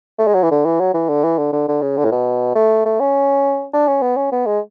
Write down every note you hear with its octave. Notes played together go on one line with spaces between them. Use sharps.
A3
G#3
F#3
E3
D3
E3
F#3
E3
D3
E3
D3
D3
D3
C#3
D3
A2
B2
A3
A3
C#4
D4
C#4
B3
C#4
B3
G#3